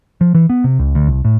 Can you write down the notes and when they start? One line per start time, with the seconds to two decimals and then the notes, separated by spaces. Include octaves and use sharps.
0.21 F3
0.35 E3
0.50 B3
0.64 C3
0.79 C#2
0.95 D2
1.07 C2
1.25 A2